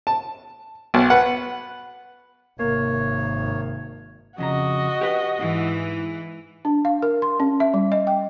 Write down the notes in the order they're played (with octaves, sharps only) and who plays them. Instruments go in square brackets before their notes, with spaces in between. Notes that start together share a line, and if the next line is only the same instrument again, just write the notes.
[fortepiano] A5
B1
B4 F#5
[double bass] G#1 [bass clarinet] C3 [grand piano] A#3 [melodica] C#5
[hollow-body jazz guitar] F2 C#3 A#5 [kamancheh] F#4 D#5
[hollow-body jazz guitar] G4 B4
[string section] G#2 E3
[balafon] D4
F5
A#4
C6
C#4
E5
G3
D#5
G5